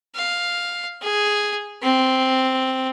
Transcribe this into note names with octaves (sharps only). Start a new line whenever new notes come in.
F5
G#4
C4